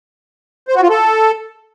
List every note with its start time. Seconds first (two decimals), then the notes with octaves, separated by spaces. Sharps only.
0.68 C5
0.75 F#4
0.83 F4
0.90 A4